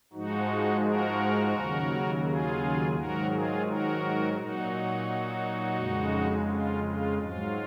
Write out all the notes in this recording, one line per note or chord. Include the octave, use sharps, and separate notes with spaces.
G#2 F3 G#3 D#4 F#4
F#4 A#4
D#2 C#3 F#3
F4 G#4
G#2 D#3 F#3 F#4 A#4
F4 G#4
F#4 A#4
A#2 F#3 D#4 F#4
F2 C#3 G#3
F4
F4
G#2 F#3 F4